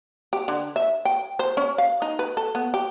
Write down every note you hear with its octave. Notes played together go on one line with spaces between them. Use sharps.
G4
D3
E5
G5
C5
C#4
F5
D#4
B4
A4
B3
G4